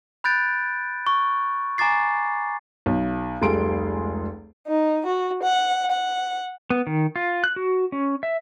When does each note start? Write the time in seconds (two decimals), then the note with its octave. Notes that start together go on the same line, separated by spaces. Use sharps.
0.24 B5 F#6 G6 A6 D7
1.07 C#6
1.78 G#5 A#5 D6 A6 C7
2.86 B1
3.42 F1 C#2 G3 G#4 C6 D7
4.67 D#4
5.06 F#4
5.43 F#5
5.91 F#5
6.70 B3
6.87 D#3
7.16 F4
7.44 F#6
7.56 F#4
7.92 C#4
8.23 E5